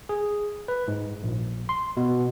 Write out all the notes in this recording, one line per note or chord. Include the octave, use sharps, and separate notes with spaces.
G#4
B4
G#2
A#1
C6
B2